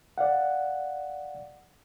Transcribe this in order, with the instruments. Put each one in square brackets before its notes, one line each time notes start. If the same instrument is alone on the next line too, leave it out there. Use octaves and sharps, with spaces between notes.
[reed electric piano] D5 F5 F#5